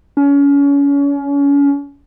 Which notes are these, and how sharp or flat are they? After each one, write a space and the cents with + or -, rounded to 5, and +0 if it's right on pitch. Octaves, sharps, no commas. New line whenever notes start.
C#4 +30